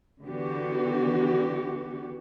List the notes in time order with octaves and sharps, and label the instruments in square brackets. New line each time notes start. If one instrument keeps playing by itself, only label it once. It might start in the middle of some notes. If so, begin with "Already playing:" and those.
[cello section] D3 E3 B3 F#4 G4